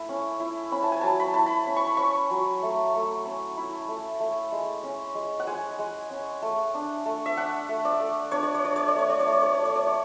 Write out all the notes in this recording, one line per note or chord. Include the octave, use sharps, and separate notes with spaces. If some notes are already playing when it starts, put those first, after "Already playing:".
Already playing: A3 E4
C#4
E4
C#4 B5
A5
G#5
F#3 A5
B5
E4 A5
B5
C#4
C#6
B5
C#4 C#6
F#3
A3
A3
C#4
E4
A3
A3
G#3
C#4
G#3
F#5
G#3 G#5
G#3
C#4
A3
D4
A3
E5
D4 F#5
A3
D5
A3
D4 C#5
D5
C#5
D4 D5
C#5
D5
A3 C#5
D5
C#5
A3
D5
C#5
D5
A3
C#5
D5
C#5